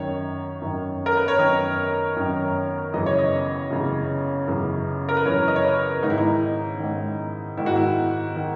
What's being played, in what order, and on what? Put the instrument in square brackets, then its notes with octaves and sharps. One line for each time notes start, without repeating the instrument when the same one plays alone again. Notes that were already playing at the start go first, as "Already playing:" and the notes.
Already playing: [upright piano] F#2 D#3 C#5
F#2 D#3
A#4
B4
C#5
F#2 D#3 D#5
F#2 D#3
F#2 C#3 E3 D#5
C#5
D#5
F#2 C#3 E3
F#2 C#3 E3
A#4
B4
F#2 C#3 E3 C#5
D#5
C#5
B4
G#2 D#4
D#3 E4
D#4
G#2 D#3
G#2 D#3 E4
F#4
E4
D#3